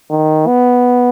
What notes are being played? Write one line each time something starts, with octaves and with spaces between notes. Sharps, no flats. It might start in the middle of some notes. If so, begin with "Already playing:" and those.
D#3
B3